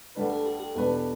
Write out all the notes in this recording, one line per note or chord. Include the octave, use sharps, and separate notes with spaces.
D2 D3 G3 D4 B4
A4
G4
G4
E2 B2 G3 D4 A4 B4